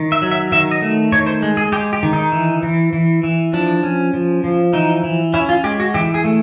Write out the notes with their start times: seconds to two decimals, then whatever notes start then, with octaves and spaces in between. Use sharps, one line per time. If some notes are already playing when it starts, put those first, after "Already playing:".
Already playing: D#3
0.12 E5
0.22 F#3
0.31 E5
0.52 D#3 E5
0.71 D#5
0.81 A3
1.12 D#3 C#5
1.26 C5
1.42 G#3
1.57 G#4
1.72 G#3 G4
1.93 G4
2.03 D#3
2.13 D#4
2.32 E3
2.63 E3
2.93 E3
3.23 E3
3.53 F3 D4
3.83 C#4
4.13 F3
4.44 F3
4.73 E3 D#4
5.04 E3
5.34 C#4 E4
5.49 F4
5.64 G#3 G4
5.80 F#4
5.94 E3 G4
6.14 G#4
6.24 A3